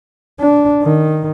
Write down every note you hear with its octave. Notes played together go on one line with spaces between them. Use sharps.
D4
D#3